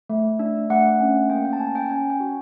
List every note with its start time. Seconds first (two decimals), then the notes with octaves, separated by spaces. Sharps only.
0.10 A3
0.39 D4
0.70 A3 F#5
1.00 C#4
1.30 A#3 G5
1.45 G5
1.53 A5
1.60 C#4 G#5
1.75 G5
1.90 C#4 G#5
2.10 G5
2.20 F#4